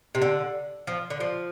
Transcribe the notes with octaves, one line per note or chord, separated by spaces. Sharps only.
C3
D3
F3
D3
F3